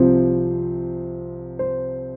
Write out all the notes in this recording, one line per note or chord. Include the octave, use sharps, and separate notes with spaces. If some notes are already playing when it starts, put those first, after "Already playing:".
Already playing: C2 C3 F3 C5
C5